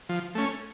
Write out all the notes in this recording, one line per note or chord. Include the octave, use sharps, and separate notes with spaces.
F3
A3 C#4